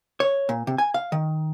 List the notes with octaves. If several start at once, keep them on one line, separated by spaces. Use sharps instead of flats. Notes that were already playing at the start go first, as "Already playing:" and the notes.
C#5
A#2
C3
G#5
F5
D#3